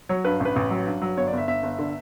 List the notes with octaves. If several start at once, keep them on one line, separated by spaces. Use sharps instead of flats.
F#3 C#5
G2 B4
A1 B4
A1
F#3
G2
F#3
G1 C#5
D5
G1 E5
G1 E5
G1
D3